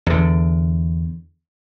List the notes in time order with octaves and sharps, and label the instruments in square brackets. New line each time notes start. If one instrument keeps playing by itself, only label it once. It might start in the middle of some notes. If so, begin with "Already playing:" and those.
[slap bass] E2 D3